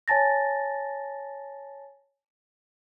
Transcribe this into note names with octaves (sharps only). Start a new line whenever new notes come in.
C#5 G#5 A5 A6 A#6